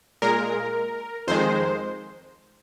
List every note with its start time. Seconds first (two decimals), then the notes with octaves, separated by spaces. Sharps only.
0.22 A#2 G#3 A#4
1.28 F2 D#3 G#3 C5